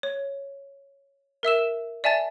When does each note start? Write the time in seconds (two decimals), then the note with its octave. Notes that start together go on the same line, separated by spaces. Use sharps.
0.03 C#5
1.43 A#4 E5 E6 E7
2.04 D5 E5 G#5 A5 A6